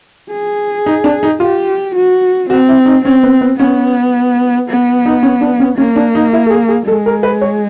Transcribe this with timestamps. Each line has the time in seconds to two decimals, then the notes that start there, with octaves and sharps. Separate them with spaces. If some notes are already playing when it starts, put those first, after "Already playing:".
0.32 G#4
0.86 D#4
1.04 D4
1.23 D#4
1.40 F4 G4
1.95 F#4
2.50 C4 F#4
2.69 E4
2.86 D#4
3.05 C4 C#4
3.23 B3
3.41 B3
3.59 B3 C#4
4.69 B3
5.06 D#4
5.23 C#4
5.41 D4
5.60 C#4
5.78 A#3 C#4
5.96 D4
6.15 D#4
6.33 E4
6.46 A4
6.50 G#4
6.68 G#4
6.87 G#3 A4
7.06 A#4
7.23 B4
7.41 C#5